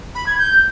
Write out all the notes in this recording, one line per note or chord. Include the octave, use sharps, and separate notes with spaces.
B5
G#6
G6